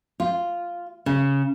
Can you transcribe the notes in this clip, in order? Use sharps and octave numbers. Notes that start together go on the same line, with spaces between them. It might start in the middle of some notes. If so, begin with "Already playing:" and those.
F4
C#3